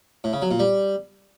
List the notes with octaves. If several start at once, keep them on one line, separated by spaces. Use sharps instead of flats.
A2
C#3
F#3
A#2
G3